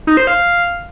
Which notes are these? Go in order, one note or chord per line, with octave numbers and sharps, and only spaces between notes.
D#4
C5
F5